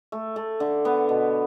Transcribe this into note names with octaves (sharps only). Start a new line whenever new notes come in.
A3
A3
D3
B3
B2